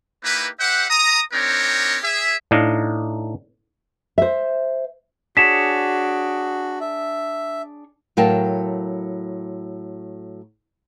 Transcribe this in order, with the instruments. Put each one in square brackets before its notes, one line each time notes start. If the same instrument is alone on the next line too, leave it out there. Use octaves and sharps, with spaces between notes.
[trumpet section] A#3 D#4 E4 G4 B4
G4 C5 E5 F#5
A#5 D#6
C4 D4 D#4 G4 A#4 C#5
G#4 E5
[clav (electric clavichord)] A2 D4 D#4 F5 A#5
[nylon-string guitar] C5 E5
[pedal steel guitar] D4 G#4 C#5 [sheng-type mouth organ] F#4 [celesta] B6 E7
[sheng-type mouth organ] E5
[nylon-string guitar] A2 F#3 A#4 F5 G5 A5